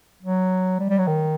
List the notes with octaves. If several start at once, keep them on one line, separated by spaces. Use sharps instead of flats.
F#3
G3
G3
F#3
D#3